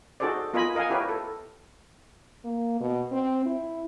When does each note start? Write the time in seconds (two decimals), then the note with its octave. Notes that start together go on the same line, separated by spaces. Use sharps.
0.20 D#4 F#4 G#4 A4 C5 D5
0.54 B3 F4 A#4 D#5 G#5 B5
0.75 A#4 D#5 F5 F#5 G#5
0.90 E4 G4 A#4 B4 C#5
1.09 A4
2.44 A#3
2.80 B2
3.12 C4
3.45 E4